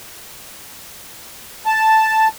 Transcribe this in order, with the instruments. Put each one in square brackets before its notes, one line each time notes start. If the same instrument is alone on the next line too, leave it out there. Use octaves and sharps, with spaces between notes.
[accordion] A5